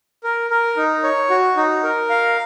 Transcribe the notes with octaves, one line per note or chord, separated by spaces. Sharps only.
A#4
A#4
D#4
C#5
F#4
D#4
A#4
F5